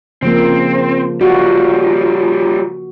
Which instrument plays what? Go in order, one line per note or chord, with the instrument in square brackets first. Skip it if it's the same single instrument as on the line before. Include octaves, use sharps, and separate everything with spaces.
[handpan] C#3 F3 A#3 [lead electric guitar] C4
[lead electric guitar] G3 F4 [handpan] F#4